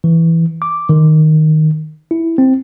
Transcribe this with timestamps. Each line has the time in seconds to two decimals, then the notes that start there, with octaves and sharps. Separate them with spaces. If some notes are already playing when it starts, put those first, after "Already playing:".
0.04 E3
0.62 D6
0.89 D#3
2.11 E4
2.38 C4